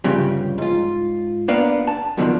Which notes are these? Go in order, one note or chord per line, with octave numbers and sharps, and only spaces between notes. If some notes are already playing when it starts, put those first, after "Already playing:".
D2 G2 C#3 F3 G4
G#2 F4
A#3 B3 D4 F5
A5
F#2 B2 D3 D#3 F3